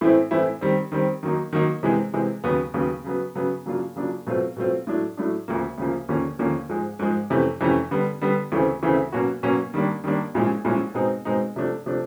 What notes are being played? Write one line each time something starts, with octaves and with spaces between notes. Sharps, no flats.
A2 E3 A3 C4 E4
A2 E3 A3 C4 E4
D#3 G3 C4
D#3 G3 C4
D#3 F#3 A#3 D#4
D#3 F#3 A#3 D#4
C3 E3 G#3 C4
C3 E3 G#3 C4
D#2 C#3 F#3 B3
D#2 C#3 F#3 B3
C#3 F#3 B3
C#3 F#3 B3
C#3 F#3 A#3 D4 F4
C#3 F#3 A#3 D4 F4
B2 F#3 A3 C4 F4
B2 F#3 A3 C4 F4
A2 F#3 A3 D4
A2 F#3 A3 D4
D2 C#3 F3 A#3
D2 C#3 F3 A#3
D#2 D3 F3 A#3 C#4
D#2 D3 F3 A#3 C#4
G#2 F3 G#3
G#2 F3 G#3
F2 C3 E3 A3 C#4
F2 C3 E3 A3 C#4
D3 G3 B3
D3 G3 B3
D2 C#3 E3 A3 C4
D2 C#3 E3 A3 C4
B2 F#3 A#3 C#4 F#4
B2 F#3 A#3 C#4 F#4
D#3 G3 A#3 D4
D#3 G3 A#3 D4
C2 A#2 F3 G#3 C#4
C2 A#2 F3 G#3 C#4
B2 G#3 C4 D#4
B2 G#3 C4 D#4
C3 F3 A3 D4
C3 F3 A3 D4